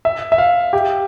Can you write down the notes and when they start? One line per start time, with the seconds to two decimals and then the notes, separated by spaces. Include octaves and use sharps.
0.05 E5
0.32 E5
0.38 F5
0.73 G4 G5